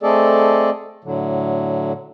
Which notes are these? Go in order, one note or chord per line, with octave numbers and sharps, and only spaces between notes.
A3 C4 G#4 A4 D5 D#5
A2 D3 F#3